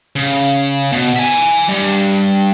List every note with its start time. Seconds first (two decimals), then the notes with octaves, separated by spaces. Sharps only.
0.16 C#3
0.92 B2
1.16 E5 G#5
1.68 G2